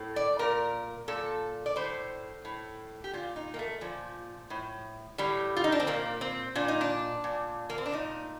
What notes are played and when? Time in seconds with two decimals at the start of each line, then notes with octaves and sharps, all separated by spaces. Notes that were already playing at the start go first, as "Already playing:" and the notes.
Already playing: A2
0.16 D5
0.39 A#2 A#4
1.08 A#2 A4
1.66 D5
1.76 A2 C5
2.45 A2
3.04 G4
3.13 A#2 F4
3.36 D#4
3.54 A#3
3.59 A3
3.81 A#2 F3
4.50 A2
5.18 A2 G3
5.56 F4
5.64 D#4
5.72 D4
5.80 C4
5.87 A#2 A#3
6.21 C4
6.55 A#2 D4
6.68 D#4
6.81 D4
7.24 A#2
7.70 A#3
7.78 C4
7.86 D4
7.92 A#2 D#4